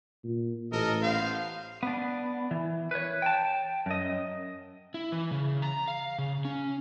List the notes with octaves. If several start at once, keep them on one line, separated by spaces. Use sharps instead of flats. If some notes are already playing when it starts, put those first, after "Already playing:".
A#2
A1 A4 A#4 D#5
B3 C5 F5
B3 D4
E3
B4 C#5
G5 A5
F#2 D#5
E4
E3
C#3
A#5
F5
C#3
C#4